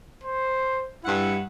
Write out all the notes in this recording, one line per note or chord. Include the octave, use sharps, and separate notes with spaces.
C5
G2 E4 F#5